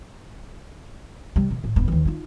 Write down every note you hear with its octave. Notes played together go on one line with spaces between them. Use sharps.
C3 G3
B2
A2
D1 B3
D#2 E3
D#4 F4